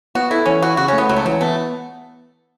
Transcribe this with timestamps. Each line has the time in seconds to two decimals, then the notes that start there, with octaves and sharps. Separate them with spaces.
0.15 B3 F#4
0.31 E4 A4
0.46 E3 C#4
0.62 E4 F#4
0.77 C#3 F#4
0.88 C#4
0.93 A3
0.98 B3
1.09 C#2 F#3
1.17 A3
1.25 E3 F#3
1.41 A3 B3